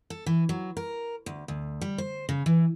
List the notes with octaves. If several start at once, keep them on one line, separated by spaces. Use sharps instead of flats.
A4
E3
F#3
A#4
D2
D2
G3
C5
C#3
E3